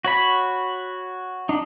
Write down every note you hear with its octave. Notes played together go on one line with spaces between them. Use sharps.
F#4 C#5 B5
D4 D#4